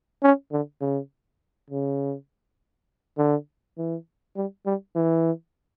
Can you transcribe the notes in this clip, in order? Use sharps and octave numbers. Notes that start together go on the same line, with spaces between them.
C#4
D3
C#3
C#3
D3
E3
G3
G3
E3